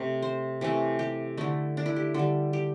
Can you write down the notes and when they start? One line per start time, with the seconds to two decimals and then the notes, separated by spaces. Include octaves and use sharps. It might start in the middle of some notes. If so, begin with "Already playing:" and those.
Already playing: C3 A3
0.22 C5
0.61 C3 E3 A3
0.99 G4
1.37 D3 A3 E4
1.77 D4
1.86 E4
1.96 G4
2.14 D3 G3 A4
2.53 G4